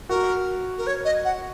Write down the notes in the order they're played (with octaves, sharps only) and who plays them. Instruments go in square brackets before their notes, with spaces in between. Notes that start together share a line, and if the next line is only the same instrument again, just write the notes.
[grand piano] F#4 [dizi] A#4
[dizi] A#4
C#5
D#5
F#5